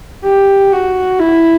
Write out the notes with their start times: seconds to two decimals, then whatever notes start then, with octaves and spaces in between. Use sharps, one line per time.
0.24 G4
0.72 F#4
1.19 E4